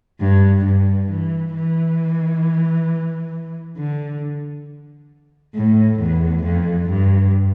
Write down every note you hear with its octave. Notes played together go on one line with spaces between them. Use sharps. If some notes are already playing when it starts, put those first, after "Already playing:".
G2
G2
E3
E3
D3
A2
E2
F2
G2